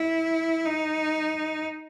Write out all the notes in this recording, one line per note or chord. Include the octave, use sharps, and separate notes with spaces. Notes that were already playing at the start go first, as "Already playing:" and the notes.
Already playing: E4
D#4